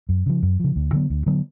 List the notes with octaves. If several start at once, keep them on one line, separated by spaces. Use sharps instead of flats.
F#2
C#3 F3
F#2
C#3 F3
D2
D3 F#3 B3
D2
D3 F#3 B3